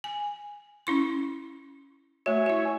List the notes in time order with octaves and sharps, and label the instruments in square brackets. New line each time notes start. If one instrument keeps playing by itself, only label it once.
[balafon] G#5
C#4 E4 C6
[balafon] A3 F#4 [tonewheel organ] C#5 E5 G#5
[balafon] E4 F#4